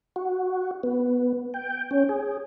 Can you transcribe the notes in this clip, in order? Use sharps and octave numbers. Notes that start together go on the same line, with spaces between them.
F#4
B3
G5
C#4
G#4